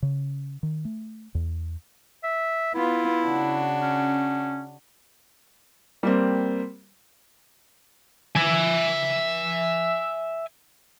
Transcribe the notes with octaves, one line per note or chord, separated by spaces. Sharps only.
C#3
D#3
A3
E2
E5
B3 E4 F4
C#3 D4 F#4
C#4
G3 A#3 C4
E5 G#5